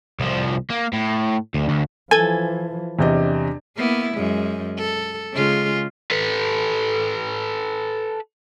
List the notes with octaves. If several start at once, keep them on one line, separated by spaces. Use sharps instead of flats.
C2 F3
A#3
A2
D2
D2
E3 F3 A4 G#5 G#6
E2 C3 D4 D#5
A#3 B3 E4
F#2 G#3
A4
C#3 G#3 F4
A4 B4